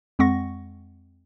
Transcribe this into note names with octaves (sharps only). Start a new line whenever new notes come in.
F2 G#3 C4 F#5 C#6 A#6